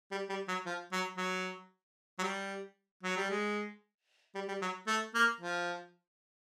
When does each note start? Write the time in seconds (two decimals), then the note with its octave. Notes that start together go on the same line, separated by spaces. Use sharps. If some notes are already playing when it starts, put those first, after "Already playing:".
0.12 G3
0.29 G3
0.48 F#3
0.66 F3
0.92 F#3
1.17 F#3
2.19 F#3
2.23 G3
3.03 F#3
3.17 G3
3.30 G#3
4.35 G3
4.48 G3
4.62 F#3
4.87 A3
5.14 A#3
5.40 F3